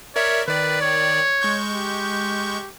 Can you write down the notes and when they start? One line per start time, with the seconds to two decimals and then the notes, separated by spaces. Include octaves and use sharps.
0.16 A#4 C#5 D5 E5
0.48 D#3 B4 D5
0.81 C#5
1.41 G#3 C#6 G6
1.73 G4